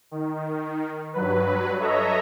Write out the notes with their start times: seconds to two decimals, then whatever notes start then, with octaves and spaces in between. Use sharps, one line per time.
0.11 D#3
1.13 G2 F#3 B4
1.79 A4 C#5 D#5 E5 A#5